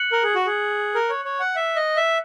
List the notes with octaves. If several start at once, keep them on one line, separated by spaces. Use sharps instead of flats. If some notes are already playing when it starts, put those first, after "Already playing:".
Already playing: F#6 C#7 F#7
A#4
G#4
F#4
G#4
A#4
C#5
C#5
F#5
E5
D#5
E5